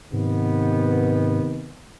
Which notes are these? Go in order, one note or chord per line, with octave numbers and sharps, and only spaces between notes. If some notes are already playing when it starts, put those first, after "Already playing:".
G#2 C3 D#3 B3